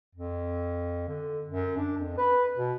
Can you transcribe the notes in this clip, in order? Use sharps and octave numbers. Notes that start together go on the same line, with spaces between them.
F2
D3
F#2
D4
F2
B4
B2